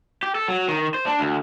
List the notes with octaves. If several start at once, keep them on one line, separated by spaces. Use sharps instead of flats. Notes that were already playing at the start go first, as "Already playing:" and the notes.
G4
A4
F#3
D#3
C5
D4
D2